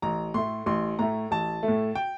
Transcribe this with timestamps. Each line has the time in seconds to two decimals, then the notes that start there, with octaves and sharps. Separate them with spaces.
0.02 A1 A#5
0.34 A2 A3 C6
0.66 A1 C6
0.99 A2 A3 A#5
1.31 A1 A5
1.63 A3
1.68 A2
1.95 G5